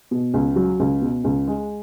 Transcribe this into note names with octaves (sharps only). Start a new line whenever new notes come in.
B2
C#2
F#3
C#2
B2
C#2
G#3